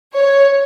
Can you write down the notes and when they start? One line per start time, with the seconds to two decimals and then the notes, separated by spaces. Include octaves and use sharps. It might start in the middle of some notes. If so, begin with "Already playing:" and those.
0.16 C#5